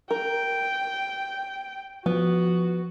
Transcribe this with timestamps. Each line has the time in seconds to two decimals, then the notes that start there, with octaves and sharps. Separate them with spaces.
0.11 A#4 G5
2.06 F3 B3 F#4